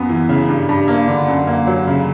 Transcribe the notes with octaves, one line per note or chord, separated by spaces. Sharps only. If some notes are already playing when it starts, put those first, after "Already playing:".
Already playing: F#2 A#3 B3
E3
C#3
G2
G2
A#3
D3
F#2
A#3
F#3
C#3